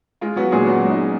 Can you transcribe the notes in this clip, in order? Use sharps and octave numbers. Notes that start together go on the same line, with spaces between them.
G#3 F4
F#3 B3 F#4
A#2 G#3 G#4
F#3 B3 F#4
G#3
D#4
G#3